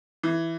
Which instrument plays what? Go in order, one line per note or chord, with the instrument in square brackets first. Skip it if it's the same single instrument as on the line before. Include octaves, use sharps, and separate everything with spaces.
[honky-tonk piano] E3